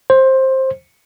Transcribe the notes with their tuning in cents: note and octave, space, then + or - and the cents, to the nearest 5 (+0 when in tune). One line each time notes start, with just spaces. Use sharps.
C5 +15